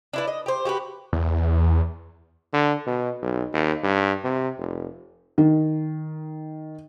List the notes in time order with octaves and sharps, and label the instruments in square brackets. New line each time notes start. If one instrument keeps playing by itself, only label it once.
[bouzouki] D4 E4 B4
D#5
G4 C5
F#4 G4 A4 B4
[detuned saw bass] E2
[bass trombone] D3
B2
B1
D#2
G2
C3
F1
[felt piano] D#3